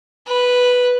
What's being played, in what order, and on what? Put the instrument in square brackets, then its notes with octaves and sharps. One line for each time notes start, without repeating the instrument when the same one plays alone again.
[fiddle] B4